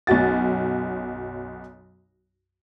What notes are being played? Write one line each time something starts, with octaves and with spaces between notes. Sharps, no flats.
B1 F#2 F#4 A6